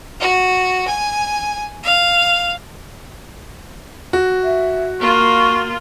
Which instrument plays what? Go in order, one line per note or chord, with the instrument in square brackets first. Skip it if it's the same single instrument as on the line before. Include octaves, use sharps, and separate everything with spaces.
[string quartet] F#4
G#5
F5
[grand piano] F#4
[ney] E5
[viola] A#3 F4 [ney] C#6